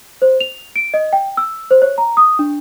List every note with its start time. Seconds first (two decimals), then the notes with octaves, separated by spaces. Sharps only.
0.22 C5
0.41 F7
0.76 D7
0.94 D#5
1.13 G5
1.37 E6
1.71 C5
1.82 C#5
1.98 A#5
2.17 D#6
2.39 D4